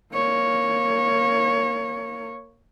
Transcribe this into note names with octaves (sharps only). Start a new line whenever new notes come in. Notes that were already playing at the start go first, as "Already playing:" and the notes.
A#3 C#5